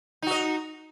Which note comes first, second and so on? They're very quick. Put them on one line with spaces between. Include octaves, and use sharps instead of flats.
D#4 F#4 D#5